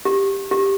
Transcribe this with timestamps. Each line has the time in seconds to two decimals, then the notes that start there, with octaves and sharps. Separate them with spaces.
0.05 G4
0.51 G4